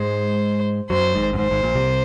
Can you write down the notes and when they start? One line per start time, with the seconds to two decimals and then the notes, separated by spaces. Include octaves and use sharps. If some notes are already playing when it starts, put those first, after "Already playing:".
Already playing: G#2 G#3 C5
0.90 F#2 F#3 C5
1.15 G#1 G#2
1.33 F#2
1.38 G#1 G#2 C5
1.51 G#1 G#2
1.63 A#1 A#2
1.75 C2 C3